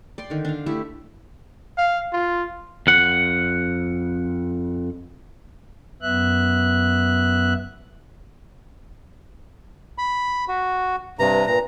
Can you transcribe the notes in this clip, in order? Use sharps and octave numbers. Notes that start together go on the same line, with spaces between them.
D5 G5 C6
D3 D#3
D4 F5
A3 E4 G4 E5
F5
F4
F2 F#5
F#2 B3 E5 F#6
B5
F#4
G2 C3 B4 A#5
A#2 A#5